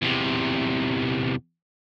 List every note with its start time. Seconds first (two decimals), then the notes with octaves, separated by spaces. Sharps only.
0.02 E2 C3